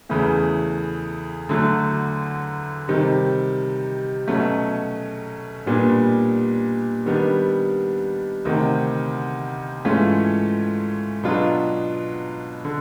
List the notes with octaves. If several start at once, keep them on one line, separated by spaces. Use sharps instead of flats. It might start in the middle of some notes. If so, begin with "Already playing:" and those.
E2 C#3 E3 A3
D2 D3 F#3 A3
C3 D#3 G3
B2 F#3 A3 C#4
A#2 G3 B3 D4
D#3 G3 B3 D4
D2 C3 D#3
G#2 E3 A3 C#4 F4
B2 F#3 B3 D4 F4
D3